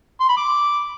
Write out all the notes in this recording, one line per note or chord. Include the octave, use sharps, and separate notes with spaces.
C6
B5
D6